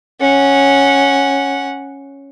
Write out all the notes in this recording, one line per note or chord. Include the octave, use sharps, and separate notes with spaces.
C#4 F#5